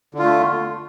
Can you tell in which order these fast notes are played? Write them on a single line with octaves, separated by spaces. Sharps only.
D3 F4 A3